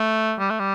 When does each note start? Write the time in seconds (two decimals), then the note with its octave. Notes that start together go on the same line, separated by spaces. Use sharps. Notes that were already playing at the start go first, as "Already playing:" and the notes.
Already playing: A3
0.39 G3
0.50 A3
0.59 G3